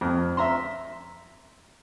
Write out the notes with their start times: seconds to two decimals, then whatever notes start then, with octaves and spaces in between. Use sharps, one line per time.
0.01 F2
0.37 E5 A#5 C6